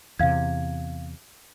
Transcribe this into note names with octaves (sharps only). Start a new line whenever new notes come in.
E2 C3 F5 G#6